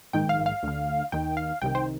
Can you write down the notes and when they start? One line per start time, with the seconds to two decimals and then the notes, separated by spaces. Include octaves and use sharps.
0.13 A#1 G#2 D#3 G5
0.29 F5
0.46 F5
0.63 D2 D3
1.12 D#2 D#3 G5
1.37 F5
1.62 C2 C3 D#3 G5
1.75 C5